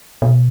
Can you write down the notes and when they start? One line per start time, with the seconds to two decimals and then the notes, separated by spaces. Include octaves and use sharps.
0.22 B2